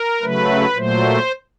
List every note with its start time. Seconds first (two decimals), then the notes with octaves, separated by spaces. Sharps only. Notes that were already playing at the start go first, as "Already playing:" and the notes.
Already playing: A#4
0.22 C#3 F#3 A3 B4
0.75 A#2 F#3 A3 C5